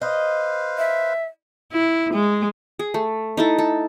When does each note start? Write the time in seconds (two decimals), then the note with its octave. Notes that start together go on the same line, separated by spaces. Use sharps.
0.01 B4 C5 D#5 F5
0.78 E5
1.72 E4
2.13 G#3
2.79 G#4
2.94 A3
3.37 D#4 E4 A4
3.58 A4